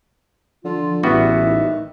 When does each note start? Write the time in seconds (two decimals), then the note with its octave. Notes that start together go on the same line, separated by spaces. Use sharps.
0.65 D3 F3 F4
1.03 A1 E2 G3 B3 F#4 E5
1.46 D#3